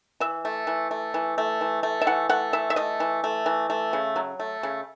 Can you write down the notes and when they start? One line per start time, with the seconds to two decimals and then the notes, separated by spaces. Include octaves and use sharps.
0.20 E3 E5
0.45 A3
0.67 E3
0.91 A3
1.14 E3
1.38 A3
1.61 E3
1.83 A3
2.01 E5
2.07 E3 F#5
2.29 A3 F#5
2.53 E3 E5
2.70 E5
2.76 A3 D#5
3.00 E3
3.24 A3
3.46 E3
3.70 A3
3.93 C#3
4.16 F#3
4.40 A3
4.63 C#3